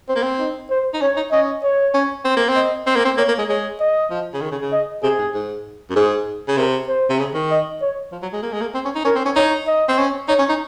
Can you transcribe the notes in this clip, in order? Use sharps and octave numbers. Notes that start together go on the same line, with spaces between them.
C4 C5
A#3
C4
D#4
C5
D#4
C#4 C#5
D#4
C#4 D#5
C#5
C#4
C4
A#3
C4
D#5
C4
A#3
C4
A#3 C#5
A#3
G#3
G#3 C#5
D#5
F3
C#3
D#3
C#3
C#3
D#5
C3 G#4
G#2
G#2
F#2
G#2 G#4
C#3
C3 A#4
C5
C3
C#3
D#3
D#5
C#5
F3
F#3
G#3
A#3
G#3
A#3
C4
C#4
D#4
C#4 A#4
C4
C#4
D#4 C#5
D#5
C4
C#4
D#4 C#5
C#4
D#4